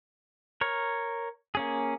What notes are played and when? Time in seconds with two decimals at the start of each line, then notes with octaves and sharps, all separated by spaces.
0.61 A#4 C#5
1.55 A#3 C#4 G#4